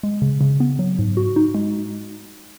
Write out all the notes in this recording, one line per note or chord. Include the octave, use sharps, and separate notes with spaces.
G#3
C#3
C#3
B3
F#3
G#2
F#4
D#4
G#3